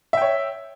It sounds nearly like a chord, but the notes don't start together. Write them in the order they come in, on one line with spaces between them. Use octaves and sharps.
E5 G5 C#5